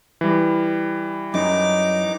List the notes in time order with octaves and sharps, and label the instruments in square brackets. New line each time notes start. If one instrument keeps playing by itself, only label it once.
[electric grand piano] E3 G3
[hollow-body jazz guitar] F#2 [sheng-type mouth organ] D#4 D6